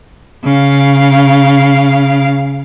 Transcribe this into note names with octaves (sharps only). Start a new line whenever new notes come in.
C#3 F5